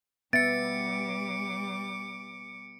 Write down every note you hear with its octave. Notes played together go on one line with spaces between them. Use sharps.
G3 B3 E5 D6 A6 C#7 D7